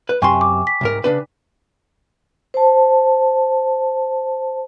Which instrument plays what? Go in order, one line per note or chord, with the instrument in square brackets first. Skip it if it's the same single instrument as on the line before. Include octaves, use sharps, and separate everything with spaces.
[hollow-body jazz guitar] B4
[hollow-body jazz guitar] F#2 C3 C6 [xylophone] G5 G#5 C#6
[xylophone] D6
B6
[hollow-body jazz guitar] C2 G#2 A#4
C#3 D4 B4
[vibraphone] C5 A5